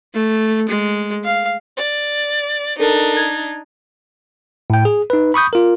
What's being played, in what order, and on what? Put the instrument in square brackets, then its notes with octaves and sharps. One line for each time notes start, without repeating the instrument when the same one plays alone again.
[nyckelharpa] A3
G#3
F5
[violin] D5
[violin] D4 D#4 [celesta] A4 A#4
[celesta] G#6
[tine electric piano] A2 G5
G#4
D#4 B4
B5 C#6 D#6 G6
F4 A#4